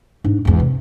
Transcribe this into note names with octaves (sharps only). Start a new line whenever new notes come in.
G#2 D4
G#1 E2
C3